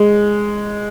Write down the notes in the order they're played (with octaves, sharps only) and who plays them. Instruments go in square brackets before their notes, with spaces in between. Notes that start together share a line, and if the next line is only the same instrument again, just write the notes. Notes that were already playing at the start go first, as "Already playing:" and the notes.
Already playing: [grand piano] G#3